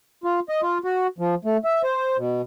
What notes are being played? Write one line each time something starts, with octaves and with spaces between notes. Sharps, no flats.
F4
D#5
F4
F#4
F3
A3
E5
C5
B2